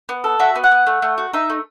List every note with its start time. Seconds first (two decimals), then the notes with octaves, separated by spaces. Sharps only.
0.09 B3
0.24 A4
0.39 F#4 E5
0.56 B3
0.64 F#5
0.71 B3
0.87 A3
1.02 A3
1.18 F#4
1.33 D#4 E5
1.50 A3